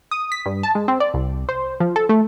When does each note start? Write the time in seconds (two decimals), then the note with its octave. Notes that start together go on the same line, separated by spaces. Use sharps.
0.11 D#6
0.32 B6
0.46 G2
0.63 A5
0.75 G#3
0.88 C4
1.00 D5
1.14 C2
1.49 C5
1.80 F3
1.96 A4
2.09 A3